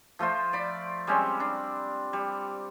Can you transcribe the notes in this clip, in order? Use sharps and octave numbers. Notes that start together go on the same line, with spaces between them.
F3 A3 F4 C5
D5 B5
G3 G#3 C4 C#4
D4
G3